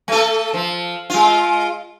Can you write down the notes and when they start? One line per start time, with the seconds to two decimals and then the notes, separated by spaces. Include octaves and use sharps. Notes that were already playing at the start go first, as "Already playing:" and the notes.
0.08 A3 A4
0.54 F3
1.10 G#3 F4